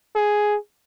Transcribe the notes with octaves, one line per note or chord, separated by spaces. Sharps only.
G#4